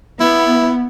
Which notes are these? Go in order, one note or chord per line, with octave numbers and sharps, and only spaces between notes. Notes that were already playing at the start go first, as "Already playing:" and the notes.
B3 E4